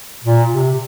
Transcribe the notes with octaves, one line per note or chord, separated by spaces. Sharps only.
A#2
C3